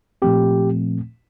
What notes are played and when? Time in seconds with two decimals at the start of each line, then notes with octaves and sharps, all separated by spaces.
0.22 A#2 F3 A3 C4 G4